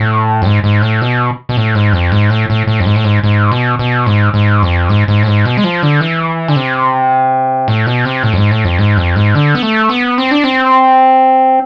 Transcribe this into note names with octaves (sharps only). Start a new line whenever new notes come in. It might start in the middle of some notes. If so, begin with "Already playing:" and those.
Already playing: A2
F2
G#2
G#2
A2
B2
B2
A2
G#2
F2
G#2
A2
A2
A2
F2
G#2
A2
G#2
G#2
B2
B2
G#2
G#2
F2
G#2
G#2
A2
G#2
B2
G#3
F3
D3
E3
D3
C3
A2
B2
C3
A2
F2
G#2
A2
F2
G#2
F2
G#2
D3
B3
A3
B3
C4
D4
C4